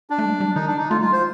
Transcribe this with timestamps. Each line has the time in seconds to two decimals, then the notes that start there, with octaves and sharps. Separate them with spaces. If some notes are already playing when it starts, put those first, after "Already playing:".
0.10 D4
0.18 A3
0.25 G3
0.40 G3
0.55 D#3 D#4
0.67 D4
0.78 D#4
0.90 A3 F4
1.01 G3 F4
1.13 C5